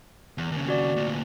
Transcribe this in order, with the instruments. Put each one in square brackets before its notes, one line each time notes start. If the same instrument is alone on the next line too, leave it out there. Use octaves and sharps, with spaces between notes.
[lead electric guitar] E2
D#2 C#3
[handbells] F#4 D5
[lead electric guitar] D2 A#2